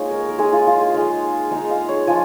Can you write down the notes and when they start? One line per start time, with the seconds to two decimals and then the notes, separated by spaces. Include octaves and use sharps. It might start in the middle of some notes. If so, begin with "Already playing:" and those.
Already playing: G#3 A#3 D#4 F4 C#5
0.11 A#4
0.29 A#4
0.38 G#3 D#4 G#4
0.53 F4
0.67 F4
0.81 G#4
0.94 G#3 D#4 F5
1.51 G#3 D#4 A#5
1.70 F5
1.88 C#5
2.07 F3 G#3 F4 G#5